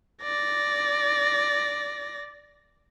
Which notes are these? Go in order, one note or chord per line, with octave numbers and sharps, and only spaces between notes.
D5 A#6